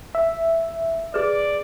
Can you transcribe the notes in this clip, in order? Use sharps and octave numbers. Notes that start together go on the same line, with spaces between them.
E5
G#4 B4 D5